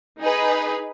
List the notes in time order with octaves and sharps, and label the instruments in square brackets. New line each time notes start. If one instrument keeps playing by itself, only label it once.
[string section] D#4 G#4 B4